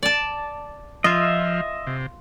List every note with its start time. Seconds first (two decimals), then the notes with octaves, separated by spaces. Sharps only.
0.03 D5 A5
1.04 F3 F4 D#5 E5
1.87 C3